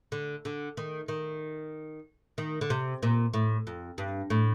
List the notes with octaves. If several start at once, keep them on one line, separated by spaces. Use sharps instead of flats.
D3
D3
D#3
D#3
D#3
D3
C3
A#2
A2
F2
G2
A2